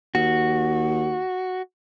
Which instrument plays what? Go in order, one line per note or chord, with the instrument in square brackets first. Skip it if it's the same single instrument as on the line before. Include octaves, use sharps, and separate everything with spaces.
[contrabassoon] D#2 [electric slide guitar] F#4